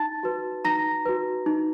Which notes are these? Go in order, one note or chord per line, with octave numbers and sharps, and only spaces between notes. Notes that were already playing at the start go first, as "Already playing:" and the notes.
Already playing: D#4 A5 A6
F#4 B4
D#4 A#5 A#6
F#4 B4
D#4